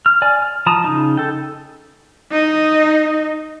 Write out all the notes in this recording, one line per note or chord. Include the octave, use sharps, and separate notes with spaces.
F6
D5 G#5
F6
F3 A5 A#5 D#6
C#3 D#4
A4 G5
D#4 D#5